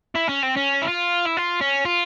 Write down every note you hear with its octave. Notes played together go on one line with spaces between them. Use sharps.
E4
C#4
C4
C#4
E4
F4
E4
F4
C#4
F4